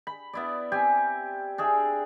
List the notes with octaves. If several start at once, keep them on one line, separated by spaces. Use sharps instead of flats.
B5
B3 E4 D5
C4 G4 G#5
D4 G#4 E5